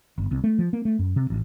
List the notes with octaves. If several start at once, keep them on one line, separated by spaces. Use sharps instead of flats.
G1
C2
A3
F3
A#3
A3
F#2
C3
A1